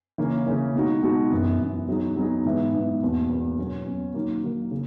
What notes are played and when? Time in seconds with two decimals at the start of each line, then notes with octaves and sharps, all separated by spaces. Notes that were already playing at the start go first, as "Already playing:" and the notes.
0.18 C#3 E3 A#3 C#4
0.46 C#3 E3 A#3 C#4
0.74 B2 G#3 D#4 F#4
1.02 B2 G#3 D#4 F#4
1.31 F#2 E3 B3
1.60 F#2 E3 B3
1.88 F#3 B3 D#4 G#4
2.16 F#3 B3 D#4 G#4
2.45 G#2 E3 B3 E4 B4
2.74 G#2 E3 B3 E4 B4
3.01 E2 B2 A#3
3.29 E2 B2 A#3
3.59 B2 F#3 C#4
3.86 B2 F#3 C#4
4.14 D#3 F#3 A#3
4.43 D#3 F#3 A#3
4.71 C#3